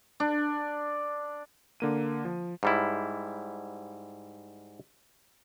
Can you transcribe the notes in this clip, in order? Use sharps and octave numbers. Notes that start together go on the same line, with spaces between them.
D4
D3 A#3 D#7
F3
G#2 G3 E4